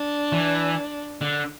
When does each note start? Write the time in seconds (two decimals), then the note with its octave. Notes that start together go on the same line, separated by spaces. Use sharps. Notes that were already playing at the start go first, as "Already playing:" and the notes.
Already playing: D4
0.32 E3
1.21 D3